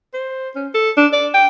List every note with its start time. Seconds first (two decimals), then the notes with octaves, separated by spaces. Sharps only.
0.14 C5
0.56 C#4
0.74 A4
0.97 D4
1.13 D5
1.34 G5